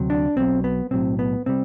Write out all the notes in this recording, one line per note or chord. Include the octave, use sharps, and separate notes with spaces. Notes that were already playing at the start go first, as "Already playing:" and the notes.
Already playing: D2 C3 F#3
D4
B1 B2 F#3 C4
B3
B1 A2 F#3 C4
B3
C3 G3 C4